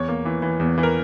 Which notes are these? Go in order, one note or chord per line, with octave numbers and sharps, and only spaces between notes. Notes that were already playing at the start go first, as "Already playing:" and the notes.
Already playing: E2 C#5
A#3
E3
E3
E2
E3
A#4